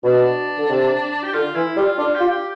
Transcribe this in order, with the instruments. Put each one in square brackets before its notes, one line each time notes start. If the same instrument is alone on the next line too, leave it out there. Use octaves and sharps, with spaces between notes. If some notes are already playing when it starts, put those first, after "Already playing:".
[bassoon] B2 [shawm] D4
[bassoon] D3
C3
[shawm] G4
[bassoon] D3 [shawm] F4
[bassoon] E3 [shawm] E4
[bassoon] G3 [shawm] F4
[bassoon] D4 [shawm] F4
[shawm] G4
[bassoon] F4
[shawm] G4